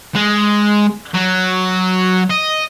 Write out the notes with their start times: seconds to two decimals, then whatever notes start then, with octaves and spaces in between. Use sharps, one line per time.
0.15 G#3
1.14 F#3
2.31 D#5